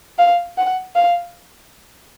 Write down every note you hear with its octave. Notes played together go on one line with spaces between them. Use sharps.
F5
F#5
F5